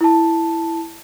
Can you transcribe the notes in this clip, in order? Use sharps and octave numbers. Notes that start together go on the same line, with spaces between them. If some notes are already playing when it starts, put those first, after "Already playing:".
E4 A5